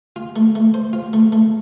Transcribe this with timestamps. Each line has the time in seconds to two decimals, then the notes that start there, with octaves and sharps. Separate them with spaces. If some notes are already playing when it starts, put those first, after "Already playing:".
0.16 F4
0.36 A3
0.55 A3
0.74 C5
0.93 F4
1.13 A3
1.32 A3